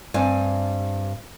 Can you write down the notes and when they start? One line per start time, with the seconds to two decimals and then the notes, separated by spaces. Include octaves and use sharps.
0.14 G2 C4 G#5